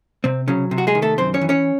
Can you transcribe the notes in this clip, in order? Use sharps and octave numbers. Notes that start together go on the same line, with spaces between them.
C3 C4
C#3 F#3 C#4
C3
F#4
G#3 G#4
D#3
A3 A4
F#2 C4 C5
C#4 C#5
E3
C#4 C#5